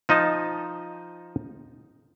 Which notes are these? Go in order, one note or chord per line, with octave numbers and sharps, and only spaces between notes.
F3 D#4 D#5 A5